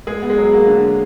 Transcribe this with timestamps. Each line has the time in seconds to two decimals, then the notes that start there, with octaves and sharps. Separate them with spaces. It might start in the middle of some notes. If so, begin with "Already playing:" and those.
0.07 G#3 G#4
0.22 B3
0.30 G#3
0.38 F#3
0.53 A#3
0.67 D3